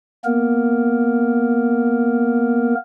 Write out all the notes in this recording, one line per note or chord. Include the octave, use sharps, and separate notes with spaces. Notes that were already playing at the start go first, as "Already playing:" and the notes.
A#3 B3 A#4